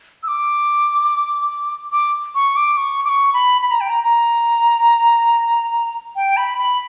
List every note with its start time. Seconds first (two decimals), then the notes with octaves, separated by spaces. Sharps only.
0.23 E6
0.28 D6
1.92 D6
2.35 C#6
2.56 D6
2.77 C#6
3.05 D6
3.09 C#6
3.34 B5
3.62 B5
3.71 A#5
3.81 G5
3.90 A#5
4.04 A#5
6.16 G5
6.37 B5
6.58 B5